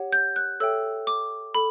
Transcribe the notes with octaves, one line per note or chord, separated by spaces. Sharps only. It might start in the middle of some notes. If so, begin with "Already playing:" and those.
Already playing: G4 C#5 F#5
G6
F#6
A4 C#5 E5 G5 E6
D6
A4 B5